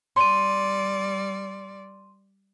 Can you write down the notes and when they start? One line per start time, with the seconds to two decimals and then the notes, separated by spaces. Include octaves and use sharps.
0.16 G3 D5 C6 D#7